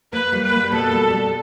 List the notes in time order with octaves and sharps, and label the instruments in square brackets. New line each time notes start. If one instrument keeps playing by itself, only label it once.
[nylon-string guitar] A#3 [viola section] B4
[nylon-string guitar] G3
[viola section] B4
[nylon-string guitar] A#3
[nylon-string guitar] B2 [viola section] A4
[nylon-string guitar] G3
G3